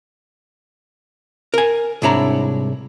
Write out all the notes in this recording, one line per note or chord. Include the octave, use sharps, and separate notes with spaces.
A#4 G#5
C2 G#2 D4 E4 C#5 A#5